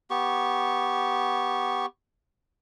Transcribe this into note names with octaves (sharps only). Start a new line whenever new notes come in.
B3 G4 C#6